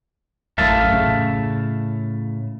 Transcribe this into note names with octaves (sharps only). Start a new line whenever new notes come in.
A1 F#2 A2 E5 F5 A5
A2 C#3